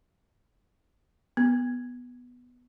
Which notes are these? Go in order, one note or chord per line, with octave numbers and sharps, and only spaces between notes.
B3